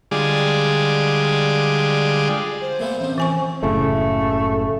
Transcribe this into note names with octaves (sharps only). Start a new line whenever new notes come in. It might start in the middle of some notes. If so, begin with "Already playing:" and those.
D3 G3 G#3 F4 G#4 D5
C5
A#2 A3 B3
A1 C3
E3 G#5 C#6
F#1 A2 C#3 A3